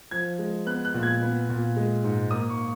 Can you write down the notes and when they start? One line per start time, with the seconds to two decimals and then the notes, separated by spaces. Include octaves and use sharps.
0.11 F3 G#6
0.39 G#3
0.66 B3 F#6
0.85 F#6
0.94 A#2
1.03 G#6
1.22 B3
1.49 A#2
1.77 G#3
2.04 G#2
2.31 A#3 D#6
2.50 C#6